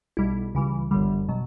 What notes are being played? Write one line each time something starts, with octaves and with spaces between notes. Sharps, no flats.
B1 B2 G3 E4
C#2 C#3 E3 G3
G1 F#2 D3 G3
B2 F#3